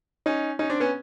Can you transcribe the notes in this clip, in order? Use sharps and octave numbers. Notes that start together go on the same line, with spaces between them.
C#4 D#4
C#4 D#4
C4 D4
B3 C#4